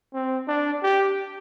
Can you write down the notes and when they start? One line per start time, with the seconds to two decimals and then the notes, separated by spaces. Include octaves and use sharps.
0.13 C4
0.47 D4
0.83 G4